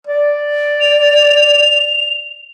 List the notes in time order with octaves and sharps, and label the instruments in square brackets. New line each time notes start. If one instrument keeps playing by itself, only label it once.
[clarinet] D5
[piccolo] F7